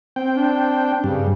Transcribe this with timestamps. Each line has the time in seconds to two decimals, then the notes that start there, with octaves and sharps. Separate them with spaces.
0.16 C4 G5
0.36 D4
1.04 G2 C#3